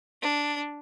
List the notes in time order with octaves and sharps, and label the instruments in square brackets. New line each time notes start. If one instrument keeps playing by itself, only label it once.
[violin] D4